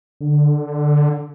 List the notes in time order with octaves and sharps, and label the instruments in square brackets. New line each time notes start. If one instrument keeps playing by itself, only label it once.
[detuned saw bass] D3